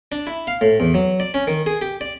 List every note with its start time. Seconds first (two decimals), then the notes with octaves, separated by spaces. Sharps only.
0.12 D4
0.27 E4
0.47 F5
0.61 A2
0.80 E2
0.94 F#3
1.20 D5
1.34 C#4
1.47 D#3
1.66 G#4
1.82 G4
2.01 D5